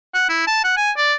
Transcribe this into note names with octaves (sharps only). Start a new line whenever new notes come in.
F#5
E4
A5
F#5
G#5
D5